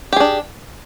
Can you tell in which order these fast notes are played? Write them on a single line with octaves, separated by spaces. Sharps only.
G4 G#4 D4